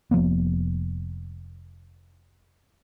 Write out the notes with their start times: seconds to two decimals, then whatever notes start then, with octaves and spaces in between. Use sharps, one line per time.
0.11 F1 F3 A#3 B3